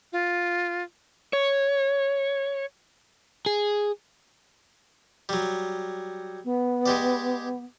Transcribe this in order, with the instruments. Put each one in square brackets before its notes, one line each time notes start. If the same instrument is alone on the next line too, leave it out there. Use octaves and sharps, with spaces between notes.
[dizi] F4
[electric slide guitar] C#5
[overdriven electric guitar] G#4
[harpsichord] F#3 G3
[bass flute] B3
[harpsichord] G#3 G4 D5